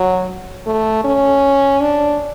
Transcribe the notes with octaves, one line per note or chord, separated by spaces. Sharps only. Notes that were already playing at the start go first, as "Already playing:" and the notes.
Already playing: F#3
A3
C#4
D4